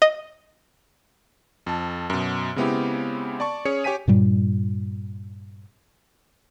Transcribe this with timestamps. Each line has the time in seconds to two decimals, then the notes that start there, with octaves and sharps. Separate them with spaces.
0.02 D#5
1.67 F2 A5
2.10 F#2 B2
2.56 C#3 G#3 B3 C4 E4 G4
3.40 D5 A5 C#6
3.65 C#4 G#4 C#5 C#7
3.84 G4 C#5 G5 G#5 B6 D#7
4.08 G2 A#2 G3